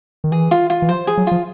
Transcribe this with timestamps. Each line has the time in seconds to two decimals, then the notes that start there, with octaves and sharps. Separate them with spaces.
0.24 D#3
0.31 E3 G#4
0.51 F4
0.70 F4
0.82 E3
0.89 F3 C5
1.07 G#4
1.18 F#3
1.27 F3 F4